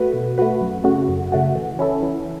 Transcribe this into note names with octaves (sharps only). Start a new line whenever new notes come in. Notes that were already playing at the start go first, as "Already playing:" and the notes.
Already playing: A3 F#4 B4
B2
A3 F#4 B4
F#2
C#3 A3 F#4
F#2
C#3 A3 F#4
E3
C#4 E4 A4
E3